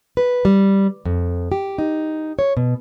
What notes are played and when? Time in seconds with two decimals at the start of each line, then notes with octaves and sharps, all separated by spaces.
0.17 B4
0.45 G3
1.05 F2
1.52 G4
1.78 D#4
2.39 C#5
2.57 B2